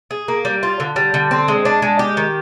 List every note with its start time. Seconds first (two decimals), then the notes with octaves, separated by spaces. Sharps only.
0.11 G#4
0.28 A#3
0.45 G3
0.63 F4
0.80 D3
0.96 G3
1.14 D3
1.31 C4
1.48 G#3
1.65 D4
1.82 G#3
1.99 G4
2.17 D#3